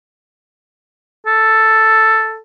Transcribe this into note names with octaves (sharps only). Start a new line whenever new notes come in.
A4